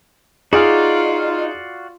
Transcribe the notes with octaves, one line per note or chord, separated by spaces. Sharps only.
D#4 F4 F#4 G#4 D5 F5